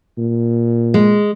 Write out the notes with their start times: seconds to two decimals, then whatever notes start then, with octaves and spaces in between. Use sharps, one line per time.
0.18 A#2
0.94 G#3